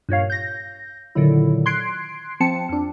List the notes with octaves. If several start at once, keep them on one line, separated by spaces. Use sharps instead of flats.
G2 A#2 C#5 F5
G6 A#6
A#2 D3 D#3 F#3 E4
C6 F#6 G#6 C7 D7
F3 C4 A5 C#7
F2 D4